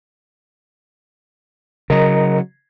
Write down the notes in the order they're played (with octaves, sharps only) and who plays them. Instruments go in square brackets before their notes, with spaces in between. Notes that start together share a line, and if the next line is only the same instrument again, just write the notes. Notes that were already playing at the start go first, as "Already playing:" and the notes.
[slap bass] C#3 F#3 [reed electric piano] A#4 D#5 A#5